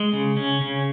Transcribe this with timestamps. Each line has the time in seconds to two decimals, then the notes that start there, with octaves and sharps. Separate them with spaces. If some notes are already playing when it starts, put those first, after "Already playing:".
Already playing: G#3
0.13 C#3
0.37 C#4
0.61 C#3